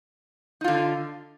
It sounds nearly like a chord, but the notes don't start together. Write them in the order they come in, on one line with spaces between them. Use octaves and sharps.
D#4 F4 D3